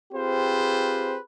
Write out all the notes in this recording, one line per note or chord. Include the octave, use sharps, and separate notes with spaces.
C4 F4 G4 G#4 B4 C5